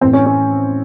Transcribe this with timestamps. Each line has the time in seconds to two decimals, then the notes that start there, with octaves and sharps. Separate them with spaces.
0.01 A2 E3 C4
0.13 C#4
0.26 C#4